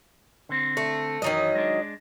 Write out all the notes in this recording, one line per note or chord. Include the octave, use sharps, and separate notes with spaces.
D3 C4
A3
F#2 D#3 E3 F#3 D#5
G#3 D4